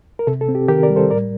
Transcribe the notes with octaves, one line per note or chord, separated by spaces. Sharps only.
A#4
C3 A4
A4
C4
G4
D#3 G4 A#4
A#4 D5
G3
A4 C5
A2 A#4 D5